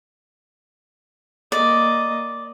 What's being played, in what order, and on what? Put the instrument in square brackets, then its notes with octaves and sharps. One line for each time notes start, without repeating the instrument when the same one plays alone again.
[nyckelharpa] A#3 D#5 [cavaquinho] D5